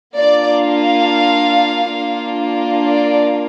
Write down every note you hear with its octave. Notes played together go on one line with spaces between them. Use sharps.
A#3 D4 F4 D5
F5
A#3 D4 F4
D5